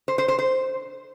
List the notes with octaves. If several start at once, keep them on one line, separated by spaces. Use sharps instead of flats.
C5
C5
C5
C5